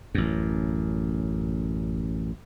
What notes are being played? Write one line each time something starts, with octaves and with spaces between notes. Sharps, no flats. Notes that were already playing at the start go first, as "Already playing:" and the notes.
A1 F#2